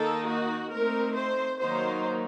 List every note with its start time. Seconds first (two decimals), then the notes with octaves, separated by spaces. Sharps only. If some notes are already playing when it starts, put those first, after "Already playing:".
Already playing: D#3 A#3 D#4 A4
0.26 F#4
0.71 A3 C4 D#4 A#4
1.15 C5
1.60 D#3 F#3 A#3 D#4 C5